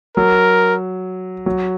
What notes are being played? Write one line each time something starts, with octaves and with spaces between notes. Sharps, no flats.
F#3 A#4
F#3